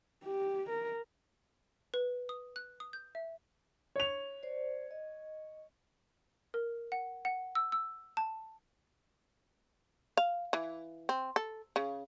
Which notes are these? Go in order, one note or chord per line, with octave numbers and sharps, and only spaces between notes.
G4
A#4
B4
D#6
F#6
D#6
G6
E5
C#5 F7
C5 D5
D#5
A#4
F#5
F#5
E6
E6
A5
F5
E3
C4
A4
C#3